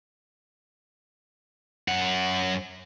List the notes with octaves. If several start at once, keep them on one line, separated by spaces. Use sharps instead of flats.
F#2 F#5